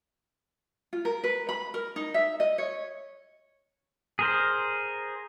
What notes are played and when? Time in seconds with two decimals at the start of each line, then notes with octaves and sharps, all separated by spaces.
0.93 F4
1.05 A#4
1.24 B4
1.49 B5
1.74 A#4
1.96 D#4
2.14 E5
2.40 D#5
2.58 C#5
4.19 G#4 A#4 C5